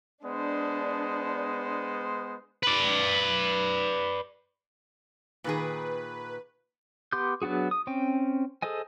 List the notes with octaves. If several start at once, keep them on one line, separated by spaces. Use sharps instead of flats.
G#3 B3 D4 C5
B4 D5
A#2 D#3 G#4 B4
B3 G4 C6 D6 G6
F#3 B3 D4 F#4 G#4
D#6
C4 C#4 G5
G#4 A4 C5 D#5 G#5